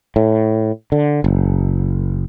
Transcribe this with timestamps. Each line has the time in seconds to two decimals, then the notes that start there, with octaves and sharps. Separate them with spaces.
0.16 A2
0.92 D3
1.24 F#1